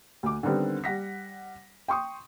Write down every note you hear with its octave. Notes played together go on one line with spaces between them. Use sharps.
D2 D6
D3 D#3 G3 B3 C4
G3 F#5 A#6 B6
G5 C6 C#6 D#6